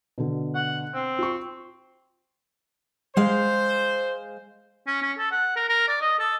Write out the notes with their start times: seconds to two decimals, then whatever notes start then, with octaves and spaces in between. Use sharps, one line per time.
0.18 B2 D3
0.55 F#5
0.94 C4
1.19 F4 C#6
3.17 G#3 C5 F5
4.87 C#4
5.02 C#4
5.18 A4
5.32 F#5
5.56 A#4
5.69 A#4
5.88 D5
6.01 D#5
6.19 A4